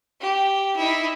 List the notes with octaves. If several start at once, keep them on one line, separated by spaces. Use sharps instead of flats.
G4
D#4 E4